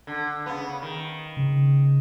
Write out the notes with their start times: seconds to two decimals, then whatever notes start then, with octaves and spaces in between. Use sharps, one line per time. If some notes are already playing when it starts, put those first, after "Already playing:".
0.07 D3
0.46 C#3 B3
0.82 D#3
1.37 C#3